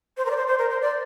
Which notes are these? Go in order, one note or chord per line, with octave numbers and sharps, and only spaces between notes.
C5
A#4
D5
C5
C5
A#4
C5
D5